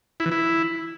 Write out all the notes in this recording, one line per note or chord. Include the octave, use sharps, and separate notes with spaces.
E4
E3
E4